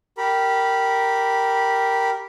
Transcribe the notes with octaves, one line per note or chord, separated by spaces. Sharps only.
G4 A#4 B5